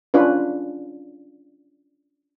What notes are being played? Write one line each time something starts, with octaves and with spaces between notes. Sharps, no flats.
C#4 D4 F4 B4